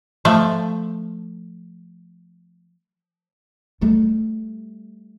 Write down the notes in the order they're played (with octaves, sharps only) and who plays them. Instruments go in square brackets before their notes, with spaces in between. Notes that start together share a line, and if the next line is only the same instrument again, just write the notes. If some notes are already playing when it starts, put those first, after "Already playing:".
[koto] F3 A3
[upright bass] G3 A3